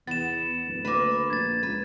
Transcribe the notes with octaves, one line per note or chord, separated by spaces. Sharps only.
E2 B3 A6 E7
D1
D2 A#3 B4
A#1 G#6 A6
C#2 B4